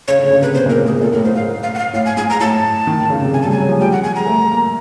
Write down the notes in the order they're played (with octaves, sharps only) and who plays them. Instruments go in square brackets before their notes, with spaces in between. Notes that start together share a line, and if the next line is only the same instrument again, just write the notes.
[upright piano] C#3 [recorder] C#5
[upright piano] D3
C#3
[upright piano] C3 [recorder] B4
[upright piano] B2 [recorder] C5
[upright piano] A#2
[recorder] A#4
[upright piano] A2
[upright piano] A#2 [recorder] G#4
[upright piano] A#2 [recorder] A4
[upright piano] A2 [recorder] A#4
[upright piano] G#2 [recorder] C5
[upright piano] A2 [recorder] F5
[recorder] F5
F#5
F5
[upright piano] A2 [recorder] F5
[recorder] G#5
[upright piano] G#2 [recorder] G#5
[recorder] A#5
[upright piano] A2 [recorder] A5
[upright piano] D#3
D#3
C#3
C3
[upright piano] C#3 [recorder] G#5
[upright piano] G3 [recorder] A5
[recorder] G#5
[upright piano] F#3
F3
[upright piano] G3 [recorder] G5
[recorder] F#5
[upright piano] G#3 [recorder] G#5
[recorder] A#5
[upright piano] A3
A#3